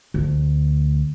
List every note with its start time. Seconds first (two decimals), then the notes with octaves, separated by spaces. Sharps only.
0.14 D2